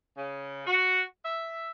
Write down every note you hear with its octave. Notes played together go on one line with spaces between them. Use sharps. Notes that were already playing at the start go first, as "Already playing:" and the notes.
C#3
F#4
E5